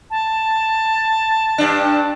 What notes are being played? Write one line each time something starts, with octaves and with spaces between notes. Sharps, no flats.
A5
G2 D4